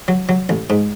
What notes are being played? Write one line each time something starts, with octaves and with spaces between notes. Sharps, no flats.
F#3
F#3
A1
G#2